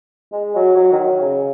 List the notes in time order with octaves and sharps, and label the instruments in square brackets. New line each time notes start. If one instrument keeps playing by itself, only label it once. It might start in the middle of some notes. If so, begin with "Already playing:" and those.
[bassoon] G#3
F#3
F#3
D#3
F#3
C#3